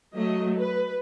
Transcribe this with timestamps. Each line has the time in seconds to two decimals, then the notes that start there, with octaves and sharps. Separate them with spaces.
0.14 F#3 A3 D#5
0.59 B4